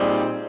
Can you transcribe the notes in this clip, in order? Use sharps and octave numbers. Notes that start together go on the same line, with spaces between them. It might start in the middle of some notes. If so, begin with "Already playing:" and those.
Already playing: A#2 G3 C4 D#4 G#4